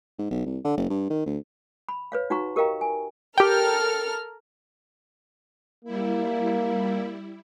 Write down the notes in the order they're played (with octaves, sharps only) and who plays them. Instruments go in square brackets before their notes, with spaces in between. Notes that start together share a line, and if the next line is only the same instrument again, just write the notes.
[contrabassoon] G#2
B1
C2
D3
F#1
G2
D#3
D2
[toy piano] B5
B4 C#5 F5
D#4 F#4 F#5 A#5 C#6
G4 A#4 D#5 F5 G5 A#5
G#5
[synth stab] G4 G5 [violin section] A4 A#4 F6
[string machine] G3 E4 [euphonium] A#3